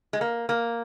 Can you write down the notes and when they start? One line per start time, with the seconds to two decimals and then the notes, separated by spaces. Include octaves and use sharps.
0.13 G#3
0.21 A#3
0.49 A#3